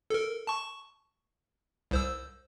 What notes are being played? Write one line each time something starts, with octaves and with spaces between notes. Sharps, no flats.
A4 A#4
A5 C#6
C2 C5 E6